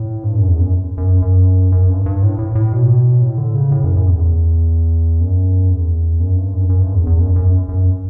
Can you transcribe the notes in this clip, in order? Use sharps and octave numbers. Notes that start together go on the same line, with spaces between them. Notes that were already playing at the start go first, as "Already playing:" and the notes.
Already playing: A2
G2
F#2
E2
F#2
F#2
F#2
F#2
G2
G2
A2
A2
A2
B2
A2
D3
C#3
A2
F#2
F#2
E2
F#2
E2
F#2
G2
F#2
F#2
G2
E2
E2
F#2
F#2
F#2